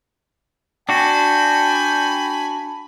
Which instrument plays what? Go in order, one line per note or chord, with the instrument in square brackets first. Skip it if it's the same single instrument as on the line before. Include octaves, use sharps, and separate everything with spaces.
[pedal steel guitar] D4 F#4 [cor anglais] G5 [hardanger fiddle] G#5 B5